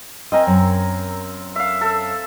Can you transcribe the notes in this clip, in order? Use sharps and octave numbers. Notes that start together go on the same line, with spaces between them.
C4 A#4 D#5 G#5
F#2
E5 F5
A4